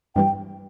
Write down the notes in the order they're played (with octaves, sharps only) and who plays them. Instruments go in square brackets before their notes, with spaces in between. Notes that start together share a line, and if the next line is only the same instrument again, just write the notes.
[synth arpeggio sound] G2 E3 G3 [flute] G5